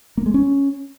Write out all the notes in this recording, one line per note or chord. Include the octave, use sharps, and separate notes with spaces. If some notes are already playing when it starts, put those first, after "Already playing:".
A#3
G#3
C#4